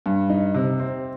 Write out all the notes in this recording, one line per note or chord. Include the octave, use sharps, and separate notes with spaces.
G2
D#4
C3
C4